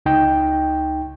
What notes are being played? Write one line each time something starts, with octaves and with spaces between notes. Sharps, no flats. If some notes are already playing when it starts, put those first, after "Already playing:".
C#2 D#4 G5